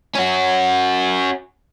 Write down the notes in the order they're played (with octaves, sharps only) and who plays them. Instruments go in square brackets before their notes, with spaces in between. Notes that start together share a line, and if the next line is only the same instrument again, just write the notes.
[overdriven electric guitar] C#4 F#4